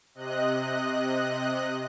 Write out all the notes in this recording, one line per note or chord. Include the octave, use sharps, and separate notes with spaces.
C3 D#5 F#6